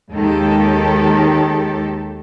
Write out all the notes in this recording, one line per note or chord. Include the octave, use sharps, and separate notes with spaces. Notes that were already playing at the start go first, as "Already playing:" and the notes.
D#2 D#3 G#3 G4 A4